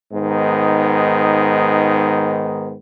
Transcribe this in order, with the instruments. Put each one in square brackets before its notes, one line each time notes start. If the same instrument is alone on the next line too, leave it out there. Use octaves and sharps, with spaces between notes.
[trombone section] G#2 D#3 B3